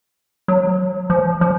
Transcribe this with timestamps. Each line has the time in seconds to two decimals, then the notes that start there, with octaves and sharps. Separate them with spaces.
0.48 F#3
1.10 F3
1.41 F3